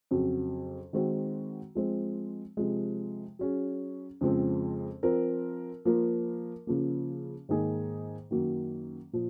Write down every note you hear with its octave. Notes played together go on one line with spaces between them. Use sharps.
F2 C#3 F#3
D#3 G#3 C4 F#4
F3 G#3 C4
C3 F3 G#3
F#3 C#4 G#4
F2 C#3 F3 G#3 C4
F3 C4 F4 A#4
F3 A#3 F4 A#4
C#3 F3 A#3
G#2 D#3 A#3 D#4 G#4
F#2 D#3 F#3 A#3
A#2 F3